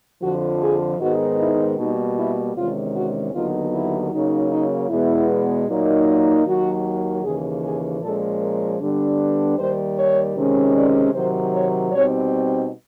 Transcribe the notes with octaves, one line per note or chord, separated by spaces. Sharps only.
F2 D3 F3 F#4
G#4
G#2 D#3 G#3 B3 D#4 F#4
E4
B2 G3 A#3 D#4
E4
E2 C3 D#3 G#3 C#4 F4
F#4
D#2 D3 F#3 B3 D#4 F4
E4
C#3 F#3 A#3 D#4
D#4
E2 B2 G#3 B3 E4
A#2 F#3 A#3 D#4
D#2 D#3 F#3 F#4
D#2 C#3 E3 G#4
G#4
A#2 F3 G#3 C#4 A4
A#4
G2 D3 G3 B3 D4
D#2 D#3 G3 C5
C#5
C3 D#3 G#3 C#4
D5
C3 D#3 F#3 C5
C#5
B2 G3 C4 D#4 C#5